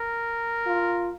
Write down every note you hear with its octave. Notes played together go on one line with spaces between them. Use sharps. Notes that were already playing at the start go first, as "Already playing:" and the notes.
Already playing: A#4
F4